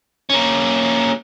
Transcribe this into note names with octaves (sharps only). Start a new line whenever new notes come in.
A#3 C#4